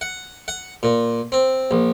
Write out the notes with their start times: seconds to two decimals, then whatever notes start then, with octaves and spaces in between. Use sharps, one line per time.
0.01 F#5
0.48 F#5
0.83 A#2
1.32 C4
1.71 A#1